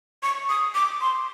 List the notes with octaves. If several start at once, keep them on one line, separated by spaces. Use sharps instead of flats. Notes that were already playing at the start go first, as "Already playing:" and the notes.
C#6
D#6
D6
C6